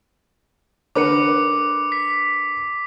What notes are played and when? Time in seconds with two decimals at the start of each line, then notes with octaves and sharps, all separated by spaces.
0.95 D3 A#4 B4 D6 C#7
1.92 B6